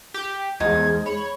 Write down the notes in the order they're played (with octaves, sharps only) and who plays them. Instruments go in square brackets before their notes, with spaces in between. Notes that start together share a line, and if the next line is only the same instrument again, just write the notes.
[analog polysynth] G4
[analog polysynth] E2 [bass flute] G#3 [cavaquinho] D#4 C5 [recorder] G#6
[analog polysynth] C#5 [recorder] B5